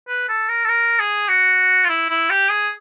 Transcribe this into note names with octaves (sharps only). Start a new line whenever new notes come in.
B4
A4
A#4
A4
A#4
G#4
F#4
F4
E4
E4
G4
G#4